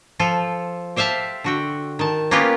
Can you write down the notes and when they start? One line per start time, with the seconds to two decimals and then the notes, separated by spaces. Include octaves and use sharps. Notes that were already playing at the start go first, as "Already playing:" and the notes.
0.19 F3 F4 A4
0.96 G4 C5 E5 F5 A5
1.44 D3 F#4 G5
1.99 D#3 A5
2.31 A#3 B3 C#4 F4 G4